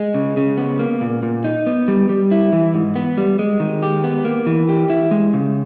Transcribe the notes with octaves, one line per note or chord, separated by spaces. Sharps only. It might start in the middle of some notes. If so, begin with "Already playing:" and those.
Already playing: G#3
C#3
C#3
B3
A#3
A#2
A#2
D#4
B3
G3
G3
E4
E3
G#2
B3
G3
G#3
D#3
G4
B3
A#3
E3
G4
E4
G#3
C#3